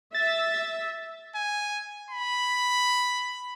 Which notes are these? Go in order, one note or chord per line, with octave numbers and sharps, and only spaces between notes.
E5 A6
G#5
B5